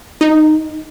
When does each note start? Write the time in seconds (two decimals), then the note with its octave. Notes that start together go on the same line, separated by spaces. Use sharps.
0.21 D#4